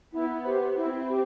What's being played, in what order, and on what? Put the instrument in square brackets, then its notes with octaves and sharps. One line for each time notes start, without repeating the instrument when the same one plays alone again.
[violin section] B3 [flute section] E4
[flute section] G4 C5
[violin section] C4 [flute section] E4
[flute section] G4